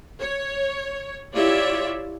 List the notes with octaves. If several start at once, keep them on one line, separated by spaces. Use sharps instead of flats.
C#5
E4 F4 G4 C#5 D5 E5